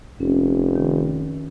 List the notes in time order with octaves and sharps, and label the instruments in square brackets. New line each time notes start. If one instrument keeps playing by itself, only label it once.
[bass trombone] F1 [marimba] C#4
[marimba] D#3